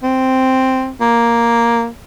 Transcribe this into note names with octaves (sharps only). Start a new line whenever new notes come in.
C4
A#3